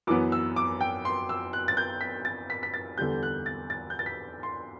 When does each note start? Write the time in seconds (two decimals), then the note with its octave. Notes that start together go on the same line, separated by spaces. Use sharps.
0.07 F#2 E3 B3 D6
0.32 E6
0.56 D6
0.81 G5
1.05 C6
1.29 E6
1.53 F#6
1.68 A6
1.77 G6
2.01 B6
2.25 A6
2.50 B6
2.63 B6
2.74 A6
2.98 E2 D3 G3 G6
3.23 F#6
3.46 A6
3.70 A6
3.90 G6
3.99 A6
4.06 B6
4.43 C6